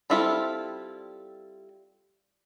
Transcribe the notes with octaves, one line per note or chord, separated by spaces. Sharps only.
G3 C4 E4 F4 A4